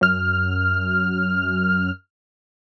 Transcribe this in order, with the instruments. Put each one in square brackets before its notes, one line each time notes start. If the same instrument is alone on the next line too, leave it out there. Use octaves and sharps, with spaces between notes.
[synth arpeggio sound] F#2 F6